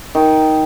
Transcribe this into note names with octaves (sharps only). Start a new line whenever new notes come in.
D#3